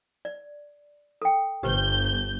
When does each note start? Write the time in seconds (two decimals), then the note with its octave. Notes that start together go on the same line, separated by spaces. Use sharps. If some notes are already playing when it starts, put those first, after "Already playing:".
0.25 D5
1.22 A4 G5
1.63 G1 G4 B4 C5 G6